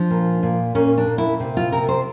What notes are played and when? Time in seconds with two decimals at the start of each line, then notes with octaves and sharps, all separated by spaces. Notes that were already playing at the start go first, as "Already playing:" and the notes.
Already playing: F3 D4
0.10 A#2
0.43 A#2
0.75 A#2 C#4
0.98 D4
1.07 A#2
1.18 E4
1.40 C3
1.57 F4
1.72 C3 A#4
1.89 C5